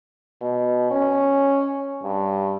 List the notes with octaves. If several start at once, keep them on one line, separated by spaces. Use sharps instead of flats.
B2
C#4
G2